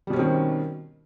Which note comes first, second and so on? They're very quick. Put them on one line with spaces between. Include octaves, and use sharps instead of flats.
G3 B2 C#4 C4 D#3